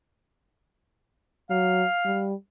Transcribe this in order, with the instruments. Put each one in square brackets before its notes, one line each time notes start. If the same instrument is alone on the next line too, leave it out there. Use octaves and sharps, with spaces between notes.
[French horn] F#3 [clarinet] F5
[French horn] G3